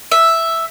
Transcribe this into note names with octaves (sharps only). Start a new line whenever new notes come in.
E5